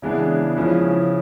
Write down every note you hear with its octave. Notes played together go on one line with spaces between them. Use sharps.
C#3 E3 G#3 B3 D4
C#3 F3 G#3 C#4 E4